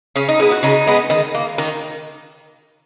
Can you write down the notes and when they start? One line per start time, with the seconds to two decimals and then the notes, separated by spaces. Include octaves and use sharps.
0.16 C#3 C#4
0.29 D#4
0.40 G#3 B3 E4
0.51 F#4
0.63 C#3 D#4
0.87 G#3 B3
1.10 D#3
1.35 A#3
1.58 D#3